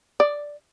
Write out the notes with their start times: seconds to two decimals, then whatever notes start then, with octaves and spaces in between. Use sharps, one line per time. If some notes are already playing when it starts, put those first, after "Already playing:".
0.20 D5